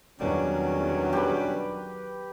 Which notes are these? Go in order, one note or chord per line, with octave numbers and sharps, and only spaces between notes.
E2 B2 D#3 F#3 G3 C#4 D4
G4 B4